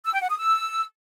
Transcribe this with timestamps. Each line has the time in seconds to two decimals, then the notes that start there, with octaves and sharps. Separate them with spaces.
0.06 E6
0.14 G5
0.22 F#5
0.31 D#6
0.39 E6